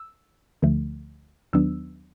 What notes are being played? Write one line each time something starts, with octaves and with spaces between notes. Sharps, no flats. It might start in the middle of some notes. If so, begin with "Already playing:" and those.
Already playing: E6
D2 D3 F3 A3
D#2 D#3 F#3 B3 D4 E6